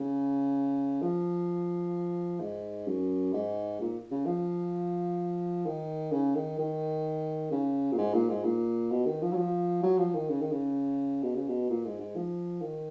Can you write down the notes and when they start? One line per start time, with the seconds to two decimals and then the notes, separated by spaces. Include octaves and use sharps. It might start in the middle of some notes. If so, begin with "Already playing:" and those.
Already playing: C#3
1.02 F3
2.40 G#2
2.88 F#2
3.33 G#2
3.81 A#2
4.11 C#3
4.26 F3
5.66 D#3
6.12 C#3
6.35 D#3
6.59 D#3
7.52 C#3
7.92 A#2
7.98 G#2
8.14 A#2
8.29 G#2
8.44 A#2
8.91 B2
9.06 D#3
9.22 F3
9.33 F#3
9.37 F3
9.83 F#3
9.99 F3
10.15 D#3
10.30 C#3
10.41 D#3
10.52 C#3
11.23 B2
11.35 C#3
11.48 B2
11.70 A#2
11.85 G#2
12.00 G#2
12.16 F3
12.62 D#3